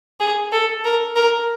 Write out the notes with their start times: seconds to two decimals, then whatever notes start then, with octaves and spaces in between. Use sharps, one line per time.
0.20 G#4
0.52 A4
0.85 A#4
1.16 A#4